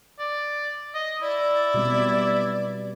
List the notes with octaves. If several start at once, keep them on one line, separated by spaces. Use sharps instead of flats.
D5
D#5
E4 D5
B2 G3 C4